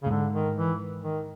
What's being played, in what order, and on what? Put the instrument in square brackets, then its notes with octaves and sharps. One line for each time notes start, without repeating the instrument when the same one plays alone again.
[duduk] C#3
[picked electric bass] A2
[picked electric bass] G#2 [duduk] D3
[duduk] D#3
E3
D#3